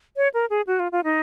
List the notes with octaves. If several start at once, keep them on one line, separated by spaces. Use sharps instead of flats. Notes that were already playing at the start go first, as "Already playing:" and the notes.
C#5
A#4
G#4
F#4
F4
F4
D#4